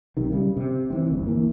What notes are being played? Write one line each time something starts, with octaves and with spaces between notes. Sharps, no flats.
B1 C3 D#3
C#3 G3
C3
D#3 E3 C4
G1 D2
E3 A#3